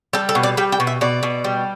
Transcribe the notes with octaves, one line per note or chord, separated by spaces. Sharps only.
G3 A4
A4
B2
D5
G3 G5
G5
B2
E5
B2 D5
B2
G3